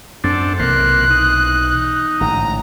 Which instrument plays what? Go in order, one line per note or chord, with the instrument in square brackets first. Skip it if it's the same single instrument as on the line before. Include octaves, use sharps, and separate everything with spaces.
[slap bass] F#2 [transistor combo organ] C4 D4 A4
[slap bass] B1 E3 [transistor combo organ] C3 A#3 C6 [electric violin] F#6
[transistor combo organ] D#4
[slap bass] A1 G#2 D3 [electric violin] A#5